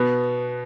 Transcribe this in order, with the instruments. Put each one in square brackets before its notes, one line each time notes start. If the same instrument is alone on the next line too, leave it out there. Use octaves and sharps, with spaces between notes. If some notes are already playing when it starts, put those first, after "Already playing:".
Already playing: [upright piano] B2 B3